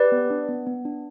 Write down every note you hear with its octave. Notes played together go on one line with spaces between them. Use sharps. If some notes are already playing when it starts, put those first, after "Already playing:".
Already playing: G4 B4 D5
B3
D4
B3
B3
D4